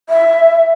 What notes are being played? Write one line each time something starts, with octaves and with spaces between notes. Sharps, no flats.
E5